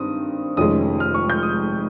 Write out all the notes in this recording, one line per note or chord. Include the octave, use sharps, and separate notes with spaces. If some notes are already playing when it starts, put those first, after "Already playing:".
Already playing: G2 D#3 C4 D#6
F1 F2 D#3 G#3 C#4 D#6
F6
C#6
G6
F6
D#6